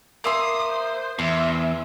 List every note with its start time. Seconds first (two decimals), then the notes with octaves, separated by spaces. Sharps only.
0.24 A#3 E5 C6 D#6
0.72 C5
1.19 E2 E5 C6